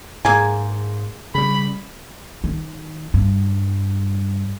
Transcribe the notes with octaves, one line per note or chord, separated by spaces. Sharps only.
G#2 A#3 G#4 G#5
C#3 G3 B5
D#3
G2